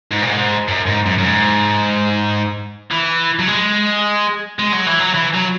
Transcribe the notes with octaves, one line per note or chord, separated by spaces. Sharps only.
G#2
A#2
G#2
F#2
G#2
F#2
F#2
G#2
E3
F#3
G#3
G#3
F#3
E3
F#3
E3
F#3